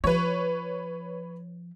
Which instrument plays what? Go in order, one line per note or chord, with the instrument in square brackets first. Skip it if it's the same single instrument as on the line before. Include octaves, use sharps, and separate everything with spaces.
[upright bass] F3 [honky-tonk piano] B4 C#5